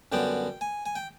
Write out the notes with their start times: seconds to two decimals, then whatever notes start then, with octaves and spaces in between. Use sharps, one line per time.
0.12 F#2 D3 G3 B3 G5
0.61 G#5
0.86 G#5
0.96 G5